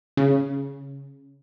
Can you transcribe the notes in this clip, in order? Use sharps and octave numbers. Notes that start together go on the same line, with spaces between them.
C#3